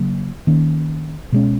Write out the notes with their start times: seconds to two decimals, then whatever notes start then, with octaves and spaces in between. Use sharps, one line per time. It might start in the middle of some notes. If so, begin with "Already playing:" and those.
Already playing: C#3 F#3 A#3
0.47 D#3 A#3 C#4
1.32 B2 G#3 C#4